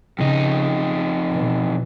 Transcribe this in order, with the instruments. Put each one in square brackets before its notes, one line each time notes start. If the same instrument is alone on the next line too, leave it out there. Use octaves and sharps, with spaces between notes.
[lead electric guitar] F2 D#4 [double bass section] C#3
[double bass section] B2 E3